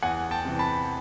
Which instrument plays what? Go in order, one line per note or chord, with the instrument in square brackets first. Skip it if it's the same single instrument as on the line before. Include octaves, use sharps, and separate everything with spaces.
[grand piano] E2 F#5 G#5
G5 A5
C3 E3
A5 B5